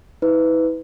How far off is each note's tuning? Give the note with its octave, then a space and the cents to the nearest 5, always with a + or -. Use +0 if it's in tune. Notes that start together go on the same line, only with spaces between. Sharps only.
E4 -40 B4 +20